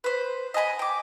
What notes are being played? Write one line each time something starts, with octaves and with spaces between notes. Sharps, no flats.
B4 C5
D#5 F#5 G#5 B5
G5 D6